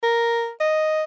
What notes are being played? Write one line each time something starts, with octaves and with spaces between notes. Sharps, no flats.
A#4
D#5